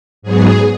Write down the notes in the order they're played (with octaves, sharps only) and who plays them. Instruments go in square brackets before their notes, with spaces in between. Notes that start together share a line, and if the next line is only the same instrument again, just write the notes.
[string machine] G#2 F#3 B3 G#4